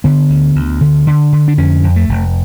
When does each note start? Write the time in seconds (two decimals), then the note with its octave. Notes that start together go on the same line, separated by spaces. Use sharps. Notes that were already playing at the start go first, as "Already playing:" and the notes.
0.04 D3 B3
0.30 D2
0.56 D2
0.81 D3
1.07 D3
1.32 D3
1.48 D4
1.57 F2 C#4
1.83 F2
1.96 A3
2.09 F1